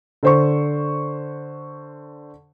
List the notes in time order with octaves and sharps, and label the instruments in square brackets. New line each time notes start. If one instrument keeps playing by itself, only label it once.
[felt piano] D3 C5 C#6